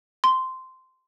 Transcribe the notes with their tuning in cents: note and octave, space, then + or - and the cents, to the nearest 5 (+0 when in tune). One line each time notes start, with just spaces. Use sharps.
C6 -10